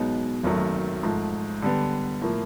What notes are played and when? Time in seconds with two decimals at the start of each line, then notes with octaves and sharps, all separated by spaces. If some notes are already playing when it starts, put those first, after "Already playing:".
Already playing: B1 B2 G#3 B3 D#4
0.43 G#1 F#2 D#3 F#3 A3
1.03 G#2 F3 A3
1.62 D3 G3 B3
2.21 A2 F3 A#3